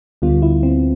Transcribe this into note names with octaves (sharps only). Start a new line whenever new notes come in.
D2 D3 G3 B3 F4
E4
C4